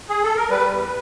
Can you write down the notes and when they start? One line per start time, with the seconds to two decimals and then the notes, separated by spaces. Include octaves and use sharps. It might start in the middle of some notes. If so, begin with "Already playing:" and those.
0.09 G#4
0.23 A4
0.36 A#4
0.50 G3 B4
0.71 E2